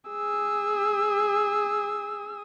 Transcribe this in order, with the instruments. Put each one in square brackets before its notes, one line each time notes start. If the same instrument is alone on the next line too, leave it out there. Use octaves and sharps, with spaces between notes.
[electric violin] G#4 E6